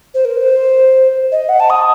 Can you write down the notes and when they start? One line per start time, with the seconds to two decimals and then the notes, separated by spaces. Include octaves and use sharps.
0.14 C5
0.25 A#4
0.37 C5
1.32 D#5
1.49 F#5
1.60 A5
1.70 D#6